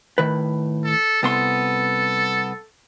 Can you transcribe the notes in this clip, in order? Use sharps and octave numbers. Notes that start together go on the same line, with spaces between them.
A2 D#3 B4
A4
C2 B3 A4 C6